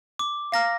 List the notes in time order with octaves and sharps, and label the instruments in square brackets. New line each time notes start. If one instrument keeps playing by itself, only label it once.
[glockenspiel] D6
[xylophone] F5 A#5 F6 [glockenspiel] A#6